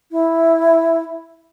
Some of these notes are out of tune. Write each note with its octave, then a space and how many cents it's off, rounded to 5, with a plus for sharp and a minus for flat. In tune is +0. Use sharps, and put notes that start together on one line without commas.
E4 +0